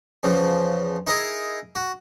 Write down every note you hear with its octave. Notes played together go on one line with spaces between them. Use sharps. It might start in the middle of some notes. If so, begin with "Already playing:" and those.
E2 C#3 F3
D#4 E4 G#4 A#4 D#5
F#4